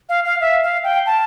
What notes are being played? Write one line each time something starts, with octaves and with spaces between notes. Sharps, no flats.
F5
F5
E5
F5
G5
A5